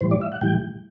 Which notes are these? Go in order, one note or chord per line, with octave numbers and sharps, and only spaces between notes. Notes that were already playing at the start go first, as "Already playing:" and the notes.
A2 E3 G3 C5
D5
E5
F#5
A2 E3 G3 G5